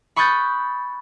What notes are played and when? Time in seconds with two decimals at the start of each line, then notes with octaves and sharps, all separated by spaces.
0.16 B5 C#6 D#6 F#6 G6 A6